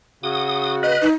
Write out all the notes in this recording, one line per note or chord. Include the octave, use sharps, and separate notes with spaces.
C#3 F#4 D#6
B4 D#5
D#4